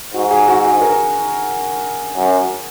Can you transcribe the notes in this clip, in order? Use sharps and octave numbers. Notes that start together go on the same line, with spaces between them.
G#2 F#4
G#4
F#4
G#4
A#4
F#2